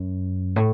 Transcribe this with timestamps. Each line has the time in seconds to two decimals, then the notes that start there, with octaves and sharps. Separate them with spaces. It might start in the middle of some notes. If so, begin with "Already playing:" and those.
Already playing: F#2
0.56 A2